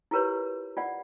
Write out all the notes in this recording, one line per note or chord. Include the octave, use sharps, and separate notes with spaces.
E4 F4 G4 A#4 B4 C#5
F4 D5 F#5